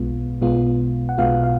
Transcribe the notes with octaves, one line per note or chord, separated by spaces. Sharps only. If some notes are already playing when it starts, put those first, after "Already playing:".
Already playing: B1 B2 G#3 B3 F4
B1 B2 G#3 B3 F4
F#5
B1 B2 G#3 B3 F4 F5
F5